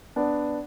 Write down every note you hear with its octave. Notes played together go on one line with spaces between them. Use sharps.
B3 D4